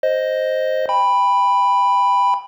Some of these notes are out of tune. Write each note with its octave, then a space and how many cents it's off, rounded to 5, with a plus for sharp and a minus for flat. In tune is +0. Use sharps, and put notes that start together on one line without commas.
C5 +0 D#5 +0
G5 +30 B5 +0